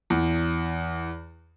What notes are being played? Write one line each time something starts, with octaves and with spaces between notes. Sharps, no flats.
E2